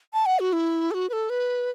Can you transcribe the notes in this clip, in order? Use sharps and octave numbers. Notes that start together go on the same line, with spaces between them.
A5
F#5
F#4
E4
A4
F#4
B4
A4
B4